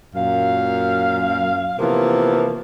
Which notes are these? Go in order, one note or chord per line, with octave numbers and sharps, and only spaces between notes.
F#2 A#2 F5
C3 E3 F3 A#3 B3